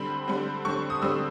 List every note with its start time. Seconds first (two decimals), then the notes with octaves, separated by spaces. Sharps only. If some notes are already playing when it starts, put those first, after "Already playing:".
Already playing: D3 G3 C4 B5
0.28 D3 G3 C4
0.65 D3 G3 C4 C#6
0.90 D#6
1.02 D3 G3 C4 E6